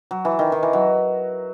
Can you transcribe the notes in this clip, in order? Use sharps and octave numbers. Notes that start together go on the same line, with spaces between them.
F#3
E3
D#3
D#3
E3
F#3